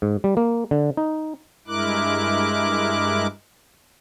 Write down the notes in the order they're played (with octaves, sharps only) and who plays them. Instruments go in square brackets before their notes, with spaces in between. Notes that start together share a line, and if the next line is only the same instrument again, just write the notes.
[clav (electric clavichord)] G#2
G3
A#3
D3
D#4
[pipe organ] G2 G#3 E4 A#4 D6 F#6